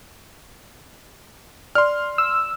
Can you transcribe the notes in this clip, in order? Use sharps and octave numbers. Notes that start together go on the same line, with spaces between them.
D5 C6 F6
E6